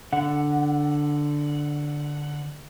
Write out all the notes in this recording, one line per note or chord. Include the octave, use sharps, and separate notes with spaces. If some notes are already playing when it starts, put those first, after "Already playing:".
D3 F#5